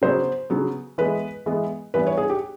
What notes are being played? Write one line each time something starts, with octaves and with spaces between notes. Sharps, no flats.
C#3 F#3 B3 C5
C#3 F#3 B3
E3 G#3 B3 B4
E3 G#3 B3
E3 G3 B3 B4
C#5
G#4
G4